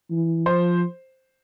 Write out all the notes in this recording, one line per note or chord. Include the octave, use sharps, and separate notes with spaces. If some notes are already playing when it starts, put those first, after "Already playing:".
E3
F3 C5